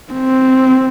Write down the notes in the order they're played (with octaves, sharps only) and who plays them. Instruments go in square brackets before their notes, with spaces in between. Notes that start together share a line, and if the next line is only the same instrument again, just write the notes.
[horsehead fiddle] C4